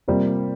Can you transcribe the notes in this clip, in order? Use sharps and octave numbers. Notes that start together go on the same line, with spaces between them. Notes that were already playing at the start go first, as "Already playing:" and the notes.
C3 G3 A#3 F4 C5